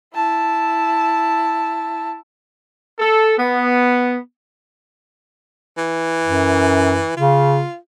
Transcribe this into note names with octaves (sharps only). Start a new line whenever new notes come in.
E4 A5
A4
B3
E3
F#2
C#3 F4